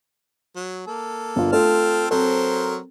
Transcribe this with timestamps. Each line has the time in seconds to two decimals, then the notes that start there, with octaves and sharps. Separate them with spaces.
0.56 F#3
0.87 A#3 A4
1.36 G1 F4
1.53 A3 C4 F4 A4 A5 F6
2.11 F#3 C4 A4 A#4 C5